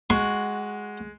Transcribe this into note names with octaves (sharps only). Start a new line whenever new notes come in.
G#3 F#4 C6